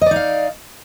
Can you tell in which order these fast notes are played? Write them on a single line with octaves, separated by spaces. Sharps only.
D#5 D5 D#4 F5